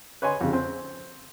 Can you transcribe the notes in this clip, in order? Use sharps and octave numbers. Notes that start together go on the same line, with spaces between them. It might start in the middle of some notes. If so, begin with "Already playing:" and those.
B4 C#5 D#5 G#5 C6
F2 C#3
C4